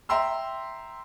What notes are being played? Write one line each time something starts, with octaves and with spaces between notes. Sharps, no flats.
E5 G5 A#5 C6 E6